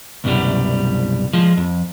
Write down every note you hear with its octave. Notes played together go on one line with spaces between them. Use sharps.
C2 F#2 B2 G3
F3 G#3
F2